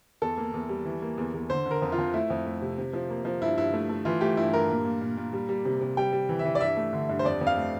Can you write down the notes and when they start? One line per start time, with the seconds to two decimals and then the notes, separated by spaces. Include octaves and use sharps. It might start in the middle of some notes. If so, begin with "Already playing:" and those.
0.22 E2 A4
0.38 A#3
0.54 E2
0.69 G3
0.85 E3
1.02 A#3
1.18 E2
1.34 E2
1.50 D3 C5
1.66 D3
1.71 A#4
1.82 F2
1.92 F4
1.98 F2
2.14 A3 E4
2.30 F2
2.46 A3
2.61 C3
2.78 C3
2.93 F3
3.10 A#3
3.25 F3
3.41 G2 E4
3.58 G2 E4
3.73 A3
3.89 A3
4.05 E3 F4
4.21 A3 G4
4.37 G2 E4
4.53 G2 A#4
4.70 A#2
4.85 A#2
5.01 A#2
5.17 A#2
5.33 G3
5.49 G3
5.65 C3
5.81 C3
5.97 G3 G5
6.13 G3
6.29 E3
6.39 E5
6.45 E3
6.55 D5
6.61 G2 E5
6.77 A3
6.93 D3
7.09 G2
7.19 C5
7.25 F2 D5
7.41 F2
7.47 F5
7.57 A3